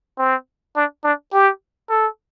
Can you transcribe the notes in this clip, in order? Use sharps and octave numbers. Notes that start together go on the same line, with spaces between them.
C4
D4
D4
G4
A4